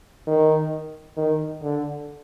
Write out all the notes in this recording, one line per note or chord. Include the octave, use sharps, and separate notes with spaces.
D#3
D#3
D3